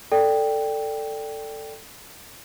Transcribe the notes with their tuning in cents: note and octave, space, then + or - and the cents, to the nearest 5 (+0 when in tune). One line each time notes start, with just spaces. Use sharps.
A4 +15 D5 +0 G5 +0